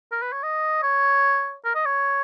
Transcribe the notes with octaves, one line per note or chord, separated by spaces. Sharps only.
A#4
B4
C#5
D#5
C#5
A#4
D#5
C#5